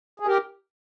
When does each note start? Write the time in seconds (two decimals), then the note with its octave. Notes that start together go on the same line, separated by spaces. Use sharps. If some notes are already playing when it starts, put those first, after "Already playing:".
0.20 G#4
0.26 G4 A#4